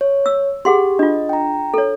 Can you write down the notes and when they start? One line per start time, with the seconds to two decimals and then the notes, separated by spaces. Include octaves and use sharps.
0.01 C#5
0.26 E6
0.65 G4 G#4 F#5 C6
0.99 D4 F4 D#5
1.29 G5 A#5
1.74 A4 C#5